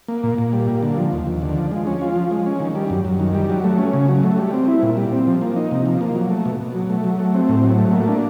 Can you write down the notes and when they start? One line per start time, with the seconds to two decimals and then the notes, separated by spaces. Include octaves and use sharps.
0.08 A#3
0.23 A#2
0.38 A#2
0.53 G3
0.68 A#3
0.83 D3
0.97 F3
1.12 D#2
1.27 D#2
1.42 D3
1.56 F3
1.71 G#3
1.87 C#4
2.01 F4
2.16 F3
2.31 G#3
2.46 C#4
2.60 D#3
2.75 G3
2.90 F#2
3.05 F#2
3.20 D#3
3.35 G3
3.50 F#3
3.64 A3
3.78 C#4
3.93 C#3
4.08 F#3
4.23 A3
4.38 G3
4.53 C4
4.68 E4
4.83 A#2
4.97 G3
5.12 C4
5.27 F3
5.41 A#3
5.56 D#4
5.71 C3
5.86 F3
6.01 A#3
6.15 F#3
6.30 A3
6.45 B2
6.60 B2
6.75 F#3
6.90 A3
7.04 F#3
7.19 A3
7.34 C4
7.49 A2
7.64 F#3
7.78 A3
7.93 A#3
8.08 D4